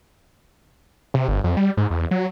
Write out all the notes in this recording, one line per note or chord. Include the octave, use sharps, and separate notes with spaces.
C3
G1
F2
G3
G#2
E2
F#3